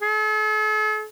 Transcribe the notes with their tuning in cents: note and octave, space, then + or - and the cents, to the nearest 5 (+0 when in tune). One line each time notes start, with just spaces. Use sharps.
A4 -45